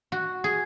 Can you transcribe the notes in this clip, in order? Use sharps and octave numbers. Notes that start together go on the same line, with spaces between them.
F#4
G#4